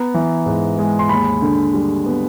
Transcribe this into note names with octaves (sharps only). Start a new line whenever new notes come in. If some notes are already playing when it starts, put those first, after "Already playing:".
Already playing: B3 A#5
E3
G#2
G#3
C6
D#2 B5
D3
G3
B3